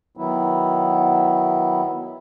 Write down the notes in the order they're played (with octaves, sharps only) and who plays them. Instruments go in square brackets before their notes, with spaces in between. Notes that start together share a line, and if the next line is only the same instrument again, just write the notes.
[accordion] D#3 F#3 B3 E4